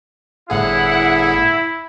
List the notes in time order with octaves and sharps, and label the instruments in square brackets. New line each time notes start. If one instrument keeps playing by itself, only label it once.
[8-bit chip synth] G1 A2 G#4 [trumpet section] E4 [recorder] F#5